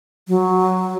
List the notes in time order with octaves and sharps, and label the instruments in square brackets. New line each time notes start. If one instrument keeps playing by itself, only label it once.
[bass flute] F#3